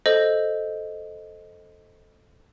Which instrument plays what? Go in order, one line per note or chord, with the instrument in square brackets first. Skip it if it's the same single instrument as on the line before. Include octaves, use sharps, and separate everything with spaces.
[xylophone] A4 C5 D#5